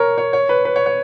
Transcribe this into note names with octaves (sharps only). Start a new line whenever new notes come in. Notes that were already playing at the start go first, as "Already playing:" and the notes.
Already playing: A#4 C#5
C#5
C#5
B4
B4
C#5
C#5